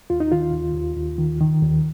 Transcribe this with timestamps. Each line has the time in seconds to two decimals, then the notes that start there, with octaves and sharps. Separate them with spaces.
0.10 D#2 F4
0.20 D#4
0.32 D#3 F4
0.53 D#2
0.74 D#2
0.97 D#2
1.18 D#3
1.41 D#3
1.62 D#2